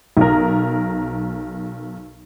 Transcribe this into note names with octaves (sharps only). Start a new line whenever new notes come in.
B1 A#4